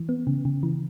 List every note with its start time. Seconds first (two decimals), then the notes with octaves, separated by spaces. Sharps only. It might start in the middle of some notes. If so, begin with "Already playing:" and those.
Already playing: E3
0.09 B3
0.27 C#3
0.45 C#3
0.63 E3